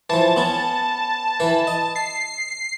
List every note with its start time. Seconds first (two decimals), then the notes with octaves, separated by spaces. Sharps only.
0.10 E3 F3 A5
0.36 B3 C#4
1.40 E3 B4
1.67 D#5
1.96 C7